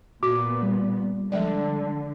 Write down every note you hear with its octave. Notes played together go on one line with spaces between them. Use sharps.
A#2 B3 F#4 D6
G3
D3 F3 G#3 D5